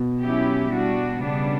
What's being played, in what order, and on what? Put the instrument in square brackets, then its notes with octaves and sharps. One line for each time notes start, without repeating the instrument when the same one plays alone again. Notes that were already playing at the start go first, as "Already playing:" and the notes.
Already playing: [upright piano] B2
[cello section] F#3 C#4 E4 G4
G3 D4 F#4
C#3 G3 B3 D4